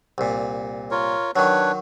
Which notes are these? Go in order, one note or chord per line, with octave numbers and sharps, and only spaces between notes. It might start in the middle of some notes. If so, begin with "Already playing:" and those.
C2 A#2
F4 A#4 C#5
D#3 F#3 D4 B4 C#5